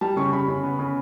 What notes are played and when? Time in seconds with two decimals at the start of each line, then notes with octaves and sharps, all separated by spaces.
0.01 G3 A5
0.17 C#3 C#6
0.32 C#3 B5
0.48 C#3
0.64 B3
0.79 C#3